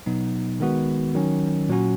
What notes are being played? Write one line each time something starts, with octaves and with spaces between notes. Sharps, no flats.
B2 F#3 B3 D#4
D#3 G#3 B3 F#4
D#3 F#3 C#4
A#2 F#3 C#4 F#4